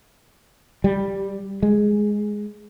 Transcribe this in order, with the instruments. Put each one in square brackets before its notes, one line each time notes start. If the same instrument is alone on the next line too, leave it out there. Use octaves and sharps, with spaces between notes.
[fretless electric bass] G3
G#3